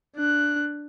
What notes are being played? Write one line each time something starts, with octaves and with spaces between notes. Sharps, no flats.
D4 F#6